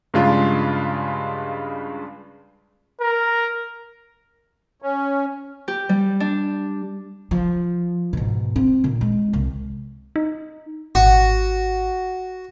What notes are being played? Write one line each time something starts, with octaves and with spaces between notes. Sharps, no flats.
G2 C#3 G#3 D4 F4
A#4
C#4
G4
G3
D4
F3
G#2 B2
C4
A#2 D#3
G#3
C2
D#4
G#1 F#4